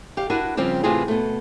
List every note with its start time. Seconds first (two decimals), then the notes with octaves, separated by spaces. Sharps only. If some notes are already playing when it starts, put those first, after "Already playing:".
0.17 G4 F5
0.30 D4 E4 F#4 A#4 B4
0.57 C#3 F3 G3 C4 G4
0.84 A2 C3 E3 C4 F4 G#4
1.08 B2 A3